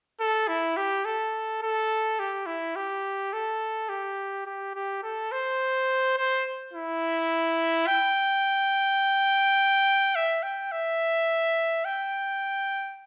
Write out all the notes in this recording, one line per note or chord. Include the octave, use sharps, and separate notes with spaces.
A4
E4
G4
A4
A4
G4
E4
G4
A4
G4
G4
G4
A4
C5
C5
E4
G5
E5
G5
E5
G5